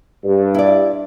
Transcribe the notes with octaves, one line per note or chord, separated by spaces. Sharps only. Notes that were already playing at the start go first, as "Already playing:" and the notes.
G2
E4 D5